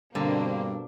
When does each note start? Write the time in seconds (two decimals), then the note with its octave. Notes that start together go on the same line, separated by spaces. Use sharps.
0.15 G2 B2 D3 A#3 C4 D4